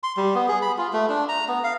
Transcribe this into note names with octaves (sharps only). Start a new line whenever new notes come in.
C6
G3
B3
G#4
B5
F4
A3
D4
A#5
B3
F5